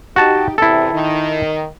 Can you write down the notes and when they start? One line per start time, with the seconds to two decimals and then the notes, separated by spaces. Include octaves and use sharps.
0.16 D#4 F#4 G4 A5
0.58 E2 C3 E4 A4
0.93 D#3